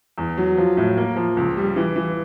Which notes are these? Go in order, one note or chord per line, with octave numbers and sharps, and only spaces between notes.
E2
F#3
F3
A2
A#3
F3
C#2
G3
E3
E3